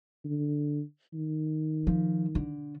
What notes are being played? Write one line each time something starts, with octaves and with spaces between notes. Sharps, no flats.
D3
D#3
F3
D3